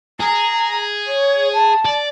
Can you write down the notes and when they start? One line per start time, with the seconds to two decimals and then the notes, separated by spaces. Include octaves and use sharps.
0.20 G#4 A#5
1.06 C#5
1.53 A5
1.85 D5